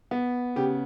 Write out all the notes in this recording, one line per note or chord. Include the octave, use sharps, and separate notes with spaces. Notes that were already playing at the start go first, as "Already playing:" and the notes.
B3
C#3 G4